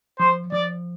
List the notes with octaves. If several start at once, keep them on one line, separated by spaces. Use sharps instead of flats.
F3 C5
F3 D5